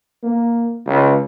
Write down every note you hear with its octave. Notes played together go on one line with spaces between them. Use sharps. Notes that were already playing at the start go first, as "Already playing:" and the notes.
A#3
C#2